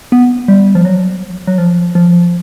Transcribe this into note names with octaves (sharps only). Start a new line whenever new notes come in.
B3
G3
F3
F#3
F#3
F3
F3